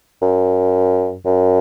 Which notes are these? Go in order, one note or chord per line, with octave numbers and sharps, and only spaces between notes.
F#2
F#2